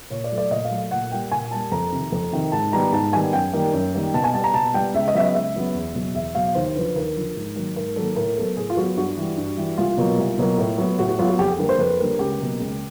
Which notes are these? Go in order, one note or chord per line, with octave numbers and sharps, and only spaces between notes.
A#2 C#5
D5
F#3 A3
D5
A#2 D#5
F5
F#3 A3
A#2 F#5
G3 A#3 G5
A#2 G#5
G3 A#3 A5
F2 A#5
C3 D#3
F2
C3 D#3
G#2 A5
D#3 G3 B3 A#5
G#2 A5
D#3 G3 B3 G#5
F#2 G5
D#3 G3 A#3
F#2
D#3 G3 A#3
B2 A5
G#5
G3 B3 A5
A#5
B2 A5
G3 B3 G5
C#2 E5
D#5
C#3 F#3 B3 E5
D#5
C#2 E5
C#3 F#3 B3
E2
B2 F#3
E2 E5
B2 F#3 F5
D#2 C5
D3 F3 B4
D#2 A#4
D3 F3
G#2
D#3 F#3 A#3
G#2 A#4
D#3 F#3 A#3 A4
A2 A#4
F#3 B3 A4
A2 G#4
F4
F#3 B3 F#4
G2 F#4
E3 G3
G2
E3 G3
C2 F4
B2 F#3 A#3
C2
B2 F#3 A#3
A2
F#3 B3
A2 F#4
F#4
F#3 B3 F4
F#4
F2 G4
G#4
D3 G3 A#3 A#4
C5
F2 B4
D3 G3 A#3 A#4
C#2 G4
B2 F#3 A#3
C#2